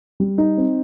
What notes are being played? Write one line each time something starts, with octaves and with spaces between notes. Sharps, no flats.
G3
D#4
C4